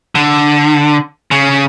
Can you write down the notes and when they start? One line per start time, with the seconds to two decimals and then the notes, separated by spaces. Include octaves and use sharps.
0.15 D3
1.31 C#3